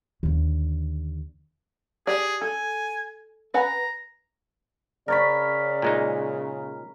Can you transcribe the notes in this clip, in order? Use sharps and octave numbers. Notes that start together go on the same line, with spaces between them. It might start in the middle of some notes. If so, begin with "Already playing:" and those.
D#2 D3
G4 G#4 D5
A4 G#5
B4 F#5 G#5 A#5
C#3 A#4 C#5 D5 B5
A#2 G#3 D#4